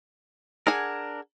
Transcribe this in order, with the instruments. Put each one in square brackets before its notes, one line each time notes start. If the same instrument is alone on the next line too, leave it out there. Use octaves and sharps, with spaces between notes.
[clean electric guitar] D4 A#4 [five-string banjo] G#4 F#5 G#5